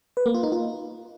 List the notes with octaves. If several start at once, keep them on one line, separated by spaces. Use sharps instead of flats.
B4
A#3
F4
D#4
F4